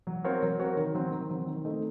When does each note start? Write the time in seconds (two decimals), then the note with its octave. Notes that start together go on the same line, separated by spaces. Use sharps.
0.07 F#3
0.24 C4 F#4 A#4 C#5
0.42 F#3
0.60 C4 F#4 A#4 C#5
0.77 D#3
0.94 F#3 C4
1.12 D#3
1.29 F#3 C4
1.47 D#3
1.64 A3 C4 D#4